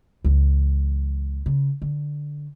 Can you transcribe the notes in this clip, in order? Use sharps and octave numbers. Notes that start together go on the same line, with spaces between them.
C#2 E3
C#3
D3